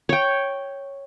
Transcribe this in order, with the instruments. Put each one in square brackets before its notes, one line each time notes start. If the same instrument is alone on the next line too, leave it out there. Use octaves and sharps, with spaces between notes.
[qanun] C#5 G5